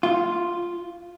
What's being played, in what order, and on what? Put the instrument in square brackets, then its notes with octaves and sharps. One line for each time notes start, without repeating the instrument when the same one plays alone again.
[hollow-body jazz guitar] F4